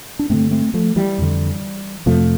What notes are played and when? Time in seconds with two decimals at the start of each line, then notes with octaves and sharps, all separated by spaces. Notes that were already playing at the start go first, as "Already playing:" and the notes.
0.19 D4
0.30 G2 D3 A3 C4
0.51 A3 C4
0.74 F3 A3
0.96 E3 G3
1.18 F2 D3
2.06 F2 C3 F3 A3